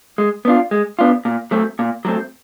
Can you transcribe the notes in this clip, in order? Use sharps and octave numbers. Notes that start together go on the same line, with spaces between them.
G#3
B3 D4 F4
G#3
B3 D4 F4
A#2
F#3 A3 C4
A#2
F#3 A3 C4